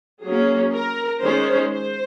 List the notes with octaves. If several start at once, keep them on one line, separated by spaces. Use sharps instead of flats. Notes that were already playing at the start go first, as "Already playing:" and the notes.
F#3 A#3 C#4 G#4
A#4
D#3 G#3 C#4 C5
C5